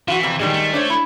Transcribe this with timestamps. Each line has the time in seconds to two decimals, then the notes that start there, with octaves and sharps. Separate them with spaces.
0.08 E3 F4 F#4
0.23 F2 C3
0.40 A#2 D#3 E3 G3 G#3
0.53 A3
0.74 D4 C5 C#5
0.90 E4